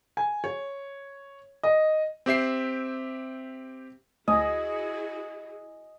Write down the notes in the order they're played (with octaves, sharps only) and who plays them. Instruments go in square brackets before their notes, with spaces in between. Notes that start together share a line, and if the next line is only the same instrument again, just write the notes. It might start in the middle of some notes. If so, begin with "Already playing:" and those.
[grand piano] G#5
C#5
D#5
[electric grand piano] C4 G4 E5 C7
[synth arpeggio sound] D2 [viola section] E4 F#4 G#4 [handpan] D#5 [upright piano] G#5 D#6